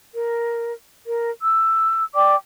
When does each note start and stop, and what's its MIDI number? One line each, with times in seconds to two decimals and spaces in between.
0.14 0.73 70
1.05 1.31 70
1.43 2.04 88
2.14 2.34 74
2.14 2.34 79
2.14 2.34 86